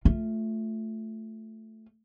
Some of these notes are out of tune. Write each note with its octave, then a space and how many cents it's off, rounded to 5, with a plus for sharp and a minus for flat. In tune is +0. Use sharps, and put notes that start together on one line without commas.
A3 +0 F4 +0